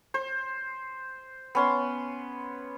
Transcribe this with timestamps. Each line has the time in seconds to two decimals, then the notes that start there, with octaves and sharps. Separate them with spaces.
0.14 C5
1.55 B3 C#4 C6